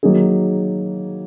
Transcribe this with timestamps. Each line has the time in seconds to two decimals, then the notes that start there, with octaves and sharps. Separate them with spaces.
0.03 D#3 F#3 A#3 D#4 G#4